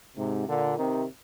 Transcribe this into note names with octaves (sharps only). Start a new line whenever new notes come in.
G#2 C3
A#2 D3
C3 D#3